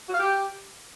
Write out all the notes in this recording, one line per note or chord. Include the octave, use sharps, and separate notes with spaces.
F#4
F5
G4